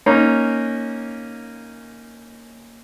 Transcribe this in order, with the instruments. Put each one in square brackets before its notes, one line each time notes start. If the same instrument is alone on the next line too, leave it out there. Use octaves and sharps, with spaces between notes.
[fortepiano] A#3 C#4 D#4